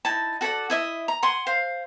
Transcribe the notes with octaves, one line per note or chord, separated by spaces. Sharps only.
D#4 E4 A5
F#4 A4 D5 F#5
E4 D#5 E5
A#5
F#5 G#5 C6
C5 F5